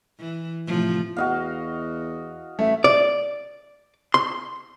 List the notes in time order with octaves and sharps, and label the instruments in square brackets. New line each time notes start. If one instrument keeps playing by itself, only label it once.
[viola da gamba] E3
A2 C3 F3
[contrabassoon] E2 [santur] F#4 D#5 F5
[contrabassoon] A1 [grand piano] A3 [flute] E5
[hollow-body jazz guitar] D5
C6